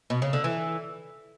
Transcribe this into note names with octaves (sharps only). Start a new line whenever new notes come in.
B2
C#3
D3
E3